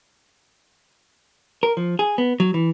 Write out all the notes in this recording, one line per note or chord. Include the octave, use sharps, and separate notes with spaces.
A#4
F3
G#4
B3
F#3
E3